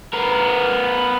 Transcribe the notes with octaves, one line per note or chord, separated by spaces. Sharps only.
B3 A#4